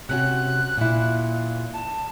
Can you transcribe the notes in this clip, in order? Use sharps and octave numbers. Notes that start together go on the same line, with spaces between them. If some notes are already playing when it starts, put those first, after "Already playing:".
C3 C#4 F#4 F#6
A#2 E4
A5